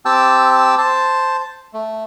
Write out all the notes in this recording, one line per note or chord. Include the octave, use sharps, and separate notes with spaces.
C4 G4 G5 A5 E6
C5 A5
A3